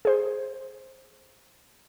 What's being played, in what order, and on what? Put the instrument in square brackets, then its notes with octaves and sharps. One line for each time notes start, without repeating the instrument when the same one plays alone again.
[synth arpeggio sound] G#4 C5